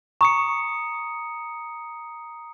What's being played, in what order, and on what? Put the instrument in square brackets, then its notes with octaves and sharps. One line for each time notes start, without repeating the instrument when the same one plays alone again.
[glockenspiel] A#5 D#6 C#7 [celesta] C#6